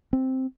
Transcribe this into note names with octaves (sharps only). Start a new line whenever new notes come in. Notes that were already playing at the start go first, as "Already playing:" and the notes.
C4